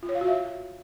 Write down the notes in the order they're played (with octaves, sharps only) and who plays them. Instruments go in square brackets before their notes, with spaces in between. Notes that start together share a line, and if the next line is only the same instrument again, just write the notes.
[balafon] F4
C#5
F5
F#4
E5